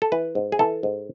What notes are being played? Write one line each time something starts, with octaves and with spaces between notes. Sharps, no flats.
A4
E3 B4
G#2
G#4
E3 A4
G#2